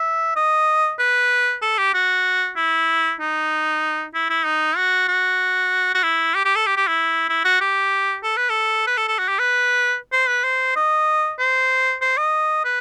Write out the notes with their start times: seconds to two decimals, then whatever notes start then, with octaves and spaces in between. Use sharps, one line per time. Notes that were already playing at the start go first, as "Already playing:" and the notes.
Already playing: E5
0.36 D#5
0.99 B4
1.62 A4
1.78 G4
1.94 F#4
2.56 E4
3.20 D#4
4.14 E4
4.30 E4
4.46 D#4
4.77 F#4
5.09 F#4
5.95 F#4
6.03 E4
6.35 G4
6.45 G4
6.56 A4
6.66 G4
6.77 G4
6.87 E4
7.29 E4
7.45 F#4
7.61 G4
8.23 A4
8.37 B4
8.50 A4
8.87 B4
8.97 A4
9.08 A4
9.19 F#4
9.28 G4
9.39 B4
10.13 C5
10.28 B4
10.44 C5
10.76 D#5
11.39 C5
12.02 C5
12.18 D#5
12.65 B4